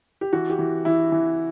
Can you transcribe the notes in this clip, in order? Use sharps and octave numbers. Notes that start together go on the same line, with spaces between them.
G4
E3 F#4
G4
E3
E3 E4
E3